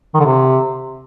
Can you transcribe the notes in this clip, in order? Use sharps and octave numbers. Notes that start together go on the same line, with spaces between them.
D#3
D3
C3